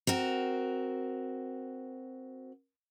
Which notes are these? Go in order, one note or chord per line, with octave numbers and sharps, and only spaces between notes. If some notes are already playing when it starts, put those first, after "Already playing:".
C4 F#4 A#4